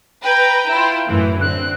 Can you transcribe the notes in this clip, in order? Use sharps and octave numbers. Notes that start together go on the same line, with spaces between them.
B4 G5 A#5
E4 F4
F#2 A2 E3
D3 C4 F#6